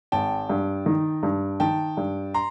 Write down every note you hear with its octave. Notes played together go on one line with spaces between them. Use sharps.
G#1 G5 A5
G2
D#3
G2
D#3 G5 A5
G2
A#5 C6